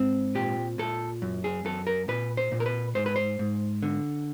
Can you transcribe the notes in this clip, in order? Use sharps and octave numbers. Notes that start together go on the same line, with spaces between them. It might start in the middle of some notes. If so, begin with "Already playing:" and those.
Already playing: G#2 C4
A#2 G4
A#2 A4
F#2
G#4
F#2 A4
A#4
A#2 B4
C5
A#2
A#4
B4
G#2 C5
B4
C5
G#2
D3